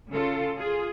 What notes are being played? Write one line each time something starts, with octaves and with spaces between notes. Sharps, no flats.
C#3 F4 A4
F4 G#4